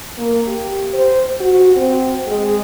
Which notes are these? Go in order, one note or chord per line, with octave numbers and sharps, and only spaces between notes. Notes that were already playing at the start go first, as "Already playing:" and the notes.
A#3
G4
C5
F#4
C4
G#3